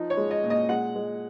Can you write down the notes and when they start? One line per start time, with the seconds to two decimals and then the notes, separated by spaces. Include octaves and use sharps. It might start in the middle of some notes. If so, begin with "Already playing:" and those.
Already playing: F3 D#4
0.10 C#5
0.17 G#3
0.31 D#5
0.44 A#2
0.50 D#5
0.69 G#3 F#5
0.95 G#3